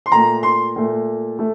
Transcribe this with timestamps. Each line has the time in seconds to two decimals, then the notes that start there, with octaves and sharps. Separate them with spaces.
0.06 C6
0.12 A#2 A3 A#5
0.43 C6
0.76 A#2 A3
1.39 A3